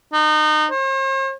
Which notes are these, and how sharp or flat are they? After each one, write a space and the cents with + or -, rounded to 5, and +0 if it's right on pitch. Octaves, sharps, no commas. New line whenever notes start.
D#4 -30
C5 +45